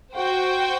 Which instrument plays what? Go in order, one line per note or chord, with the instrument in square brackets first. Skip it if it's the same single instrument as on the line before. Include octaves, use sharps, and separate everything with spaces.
[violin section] F#4 C5 G5